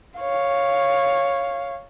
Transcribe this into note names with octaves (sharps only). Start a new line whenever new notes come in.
C#5 F5